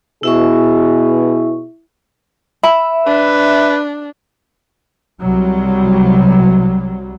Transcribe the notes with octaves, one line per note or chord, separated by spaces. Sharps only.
B2 E4 G#4 E5 C#6
E5 B5
D4 B4
C2 C3 F#3 G3